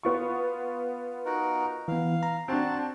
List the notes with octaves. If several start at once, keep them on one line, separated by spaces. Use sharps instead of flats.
B3 F4 C#6
D#4 F#4 A#4
E3 B3 F5
A#5
C4 D4 F#4 A5